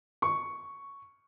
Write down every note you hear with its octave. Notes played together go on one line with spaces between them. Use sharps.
C#6